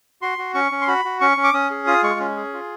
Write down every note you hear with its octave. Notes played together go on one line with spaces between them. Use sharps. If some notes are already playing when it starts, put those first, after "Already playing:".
F#4 C6
F#4
C#4 C#6
C#4
C6
F#4 B5
F#4
C#4 C#6
C#4
D6
C#4 D#6
G#4
F4 D#6
G#3 C#6
C#4
G#4
F4